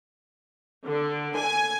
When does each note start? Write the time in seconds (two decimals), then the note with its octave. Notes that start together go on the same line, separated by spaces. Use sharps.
0.86 D3
1.37 G#5